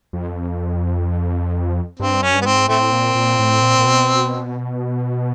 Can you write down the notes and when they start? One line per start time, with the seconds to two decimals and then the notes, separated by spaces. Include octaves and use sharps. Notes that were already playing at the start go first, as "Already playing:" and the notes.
0.13 F2
2.00 G2 C4
2.22 F#2 C#4
2.34 G2
2.42 B3
2.45 G#2 C4
2.69 A2 A3 C4
2.92 A#2
3.15 A#2
3.39 A2
3.62 A#2
3.78 A#2
3.85 B2